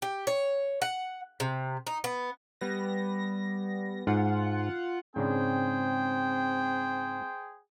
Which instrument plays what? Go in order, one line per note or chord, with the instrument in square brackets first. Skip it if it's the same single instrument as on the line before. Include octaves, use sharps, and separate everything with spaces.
[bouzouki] G4
C#5
F#5
C3
D#4
B3
[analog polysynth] G3 B3 A#6
[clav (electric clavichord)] G#2 [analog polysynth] F4 F#5
[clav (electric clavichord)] G#2 C#3 D4 [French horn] C4 [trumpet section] G#4 C5 G5